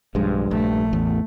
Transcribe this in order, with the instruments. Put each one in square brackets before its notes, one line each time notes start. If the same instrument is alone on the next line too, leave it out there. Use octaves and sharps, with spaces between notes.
[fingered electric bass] B1 G#3 [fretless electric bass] G2 [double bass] F3
[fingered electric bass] A#1 [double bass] A3
[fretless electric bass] A1 [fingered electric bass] E2